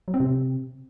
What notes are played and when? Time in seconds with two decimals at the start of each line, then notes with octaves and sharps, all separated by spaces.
0.08 F#3
0.14 C4
0.20 C3